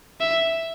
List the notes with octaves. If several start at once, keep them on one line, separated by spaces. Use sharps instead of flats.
E5